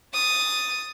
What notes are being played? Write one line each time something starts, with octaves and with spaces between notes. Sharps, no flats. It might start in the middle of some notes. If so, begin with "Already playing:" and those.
D#6 A6